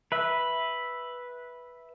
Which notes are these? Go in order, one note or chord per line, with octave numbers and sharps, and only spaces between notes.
B4 E5